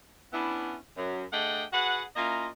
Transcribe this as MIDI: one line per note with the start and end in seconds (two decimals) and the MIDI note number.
0.33 0.76 59
0.33 0.76 61
0.33 0.76 62
0.33 0.76 64
0.97 1.23 42
1.32 1.63 57
1.32 1.63 62
1.32 1.63 68
1.32 1.63 75
1.32 1.63 78
1.32 1.63 79
1.73 2.02 66
1.73 2.02 68
1.73 2.02 71
1.73 2.02 78
2.16 2.47 58
2.16 2.47 61
2.16 2.47 64
2.16 2.47 65
2.16 2.47 75
2.16 2.47 82